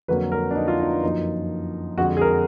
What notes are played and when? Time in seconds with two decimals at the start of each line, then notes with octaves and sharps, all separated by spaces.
0.08 F2 D3 F#3 A#3 B4
0.32 A#4
0.51 D4
0.55 D#4
0.68 F4
0.80 D#4
0.91 D4
1.03 F#2 F3 A#3 D#4
1.97 F2 D3 G#3 F#4
2.17 G#4
2.21 A#4